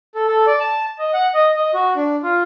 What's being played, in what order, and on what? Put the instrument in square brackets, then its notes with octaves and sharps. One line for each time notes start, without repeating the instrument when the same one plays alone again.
[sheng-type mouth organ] A4
A4
D5
A5
D#5
F#5
D#5
D#5
F#4
D4
F4